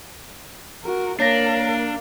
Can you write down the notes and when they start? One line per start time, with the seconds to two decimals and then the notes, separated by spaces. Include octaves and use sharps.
0.84 F#4 A#4
1.20 A#3 D4 A#4 C#5 F5 A#6